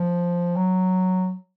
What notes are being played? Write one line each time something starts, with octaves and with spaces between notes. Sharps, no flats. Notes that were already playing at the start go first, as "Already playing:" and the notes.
Already playing: F3
F#3